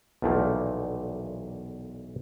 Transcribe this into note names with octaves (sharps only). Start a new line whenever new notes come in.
B1 E2 A#2 F3 A3 A#3